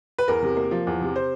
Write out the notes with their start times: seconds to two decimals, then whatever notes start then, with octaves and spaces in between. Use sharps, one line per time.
0.18 B4
0.28 E2 A#4
0.42 C3
0.57 A#3
0.71 F3
0.87 E2
1.01 C3
1.16 C5